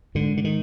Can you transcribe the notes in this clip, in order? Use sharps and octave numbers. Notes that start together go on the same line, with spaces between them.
G#2 D3
D3
D#3